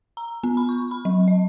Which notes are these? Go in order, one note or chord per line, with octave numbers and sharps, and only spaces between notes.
A#5
B3
B5
C#6
B5
F#3
D#5